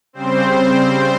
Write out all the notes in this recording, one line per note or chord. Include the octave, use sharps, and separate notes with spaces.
C#3 G3 C4 C5